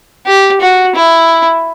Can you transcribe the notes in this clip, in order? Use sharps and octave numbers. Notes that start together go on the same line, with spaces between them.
G4
F#4
E4